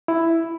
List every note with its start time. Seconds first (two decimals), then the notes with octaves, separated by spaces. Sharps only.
0.08 E4